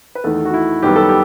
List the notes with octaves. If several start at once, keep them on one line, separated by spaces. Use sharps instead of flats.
B4
E2 D#3 A3 A4
F#4
E4
F#2 D#3 G3 B3 G4
A4
G4